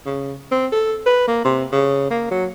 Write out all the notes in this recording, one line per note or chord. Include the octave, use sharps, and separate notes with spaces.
C#3
C4
A4
B4
A#3
C3
C#3
A#3
F#3